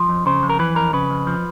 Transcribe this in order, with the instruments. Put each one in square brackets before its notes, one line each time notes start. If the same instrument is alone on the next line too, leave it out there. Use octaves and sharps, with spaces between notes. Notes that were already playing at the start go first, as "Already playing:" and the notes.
Already playing: [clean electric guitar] F3
F2
C#3 C5
F2
A#4
E3 B4
F2 A#4
C#3 B4
F2
F3